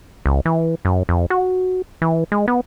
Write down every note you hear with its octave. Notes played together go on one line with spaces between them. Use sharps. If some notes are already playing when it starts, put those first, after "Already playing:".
C#2
E3
F#2
F2
F#4
E3
G#3
B3